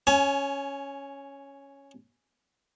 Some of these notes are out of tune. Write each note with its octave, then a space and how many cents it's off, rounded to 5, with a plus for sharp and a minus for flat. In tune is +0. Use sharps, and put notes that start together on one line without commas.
C#4 +0 G#5 +30